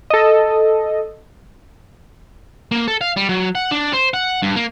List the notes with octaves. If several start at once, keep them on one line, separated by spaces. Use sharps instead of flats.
A4 D#5
A#3
A4
F5
G3
F#3
F#5
D4
C5
F#5
G2
A#3